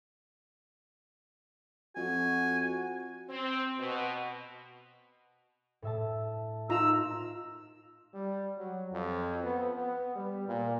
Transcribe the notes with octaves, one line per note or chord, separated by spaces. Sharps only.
F2 F#4 G#5
C4
B2
A2 E5 A5
D#4 F4 A#5 E6
G3
F#3
F2
B3
B3
G3
A#2